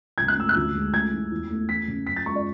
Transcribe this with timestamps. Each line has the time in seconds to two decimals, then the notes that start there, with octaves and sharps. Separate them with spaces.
0.18 C#2 G#6
0.28 F#6
0.37 A3 E6
0.49 F#6
0.56 D2
0.75 G#3
0.94 A3 G#6
1.13 E3
1.32 E2
1.50 A3
1.69 E3 B6
1.88 C#3
2.07 F#2 B6
2.16 A6
2.26 G#3 C#6
2.35 D5